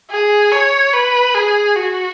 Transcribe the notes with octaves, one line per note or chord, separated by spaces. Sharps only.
G#4
C#5
B4
G#4
F#4